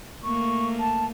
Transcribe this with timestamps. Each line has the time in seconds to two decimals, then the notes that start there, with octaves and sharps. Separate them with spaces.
0.24 A3 A#3 C#6
0.80 A5